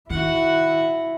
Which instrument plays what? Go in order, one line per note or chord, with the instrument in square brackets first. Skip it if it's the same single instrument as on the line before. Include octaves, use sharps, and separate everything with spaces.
[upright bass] D#3 [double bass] E4 [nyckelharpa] F#4 F#5